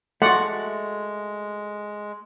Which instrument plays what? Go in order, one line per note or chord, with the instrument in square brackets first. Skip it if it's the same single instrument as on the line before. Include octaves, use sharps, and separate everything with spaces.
[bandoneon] G#3 [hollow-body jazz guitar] A3 F#4 [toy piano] A4 C6 [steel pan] D5 F#5